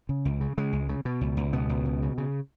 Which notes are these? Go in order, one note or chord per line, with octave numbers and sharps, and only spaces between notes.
C#3
C#2
C#3
C#3 G#3
C#2
C#3
B2
C#2
C#2
B2 B3
C#2
B2
C#3
C#3